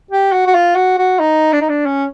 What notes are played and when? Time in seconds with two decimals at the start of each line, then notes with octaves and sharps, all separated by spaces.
0.11 G4
0.32 F#4
0.47 F#4
0.54 F4
0.76 F#4
0.98 F#4
1.20 D#4
1.53 D4
1.61 D#4
1.69 D4
1.86 C#4